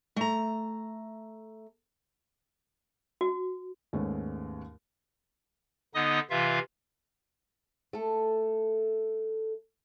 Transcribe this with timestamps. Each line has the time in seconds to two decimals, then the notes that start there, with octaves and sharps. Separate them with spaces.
0.16 A3 A#5
3.21 F#4
3.93 D#2 G#2 G#3 A3 B3 C#4
5.94 D3 B3 D#4 D#5 D#6
6.30 C3 E3 F4 E5 F5
7.93 A3 A4